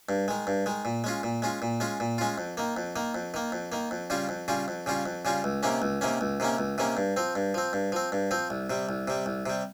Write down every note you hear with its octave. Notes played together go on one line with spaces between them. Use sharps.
G2
D#3 G#3
G2
D#3 G#3
A#2
G#3 C#4 F4
A#2
G#3 C#4 F4
A#2
G#3 C#4 F4
A#2
G#3 C#4 F4
F2
D#3 A#3
F2
D#3 A#3
F2
D#3 A#3
F2
D#3 A#3
F2
C#3 G3 C#4 F4
F2
C#3 G3 C#4 F4
F2
C#3 G3 C#4 F4
F2
C#3 G3 C#4 F4
C#2
C3 D#3 A#3 C#4
C#2
C3 D#3 A#3 C#4
C#2
C3 D#3 A#3 C#4
C#2
C3 D#3 A#3 C#4
G2
F3 C4
G2
F3 C4
G2
F3 C4
G2
F3 C4
C2
C3 G3
C2
C3 G3
C2
C3 G3